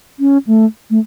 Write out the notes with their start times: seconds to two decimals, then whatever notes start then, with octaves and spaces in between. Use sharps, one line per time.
0.19 C#4
0.47 A3
0.90 A3